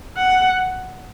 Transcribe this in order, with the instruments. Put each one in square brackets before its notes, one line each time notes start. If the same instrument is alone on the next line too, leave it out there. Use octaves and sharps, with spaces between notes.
[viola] F#5